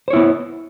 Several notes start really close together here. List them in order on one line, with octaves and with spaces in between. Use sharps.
C5 C#5 E4 B3